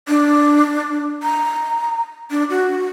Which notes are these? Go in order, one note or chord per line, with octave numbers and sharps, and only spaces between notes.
D4
A#5
D4
F#4